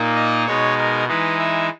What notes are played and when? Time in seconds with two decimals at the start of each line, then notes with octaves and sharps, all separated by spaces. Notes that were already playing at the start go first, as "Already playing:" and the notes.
Already playing: A#2 A#3 D#4
0.16 D#5
0.47 B2 G#3 D#4 C#5
0.78 A#4
1.08 E3 G#3 D#4 B4
1.39 E5